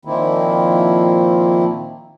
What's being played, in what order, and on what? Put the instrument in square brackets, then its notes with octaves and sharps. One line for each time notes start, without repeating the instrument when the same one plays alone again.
[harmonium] A#2 D#3 F3 A#3 C4 E4